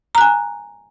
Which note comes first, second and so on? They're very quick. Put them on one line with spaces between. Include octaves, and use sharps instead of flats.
A#5 F#6 G#5